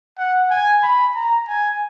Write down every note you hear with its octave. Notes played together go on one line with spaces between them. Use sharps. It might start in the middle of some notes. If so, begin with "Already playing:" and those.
F#5
G#5
B5
A#5
G#5